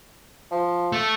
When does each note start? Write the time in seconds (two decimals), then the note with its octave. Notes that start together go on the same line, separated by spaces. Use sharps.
0.51 F3
0.92 A3